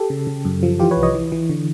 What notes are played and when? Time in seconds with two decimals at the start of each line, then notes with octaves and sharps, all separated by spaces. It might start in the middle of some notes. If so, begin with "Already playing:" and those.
Already playing: G4 A4
0.10 C#3
0.27 C#3
0.45 F#2
0.63 F3
0.80 E3 F4 G4
0.91 B4 C#5
0.97 C2
1.03 C#5 D#5
1.14 E3
1.32 E3
1.50 D3